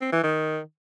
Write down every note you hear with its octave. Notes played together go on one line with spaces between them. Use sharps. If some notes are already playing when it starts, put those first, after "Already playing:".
C4
E3
D#3